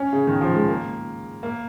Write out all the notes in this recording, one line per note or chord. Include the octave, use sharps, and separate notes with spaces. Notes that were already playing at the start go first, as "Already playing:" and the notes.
Already playing: C#4
C#3
D#3
F3
G#3
A#3
A#3